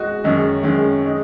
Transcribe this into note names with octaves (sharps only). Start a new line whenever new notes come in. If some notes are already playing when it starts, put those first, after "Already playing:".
Already playing: G#3 F#4 D#5
F#2 D#3 G#3 C#4
F#2 D#3 G#3 C#4
G#3 D#4